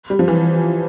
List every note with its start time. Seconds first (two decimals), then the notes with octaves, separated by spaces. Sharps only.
0.10 G3
0.19 F3
0.28 E3